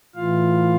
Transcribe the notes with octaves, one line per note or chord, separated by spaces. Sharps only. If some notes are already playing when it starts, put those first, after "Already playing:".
A2 E3 F4 F5